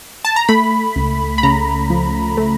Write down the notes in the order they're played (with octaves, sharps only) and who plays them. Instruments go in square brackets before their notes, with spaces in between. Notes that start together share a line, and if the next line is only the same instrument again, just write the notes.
[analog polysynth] A5
A#5
A3 B5
C#2
B5
C#3 A#5
F3
A3